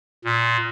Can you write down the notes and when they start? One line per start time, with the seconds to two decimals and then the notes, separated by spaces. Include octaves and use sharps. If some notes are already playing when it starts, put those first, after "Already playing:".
0.25 A#2